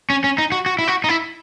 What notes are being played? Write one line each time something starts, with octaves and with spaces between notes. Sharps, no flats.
C#4
C#4
D#4
F#4
F#4
E4
F#4
D#4
E4